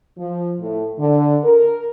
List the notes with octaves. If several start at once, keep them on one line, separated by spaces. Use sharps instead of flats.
F3
A2
D3
A#4